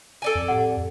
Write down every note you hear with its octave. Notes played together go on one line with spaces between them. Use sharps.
A4 D5 G#5
F2
A2 F#5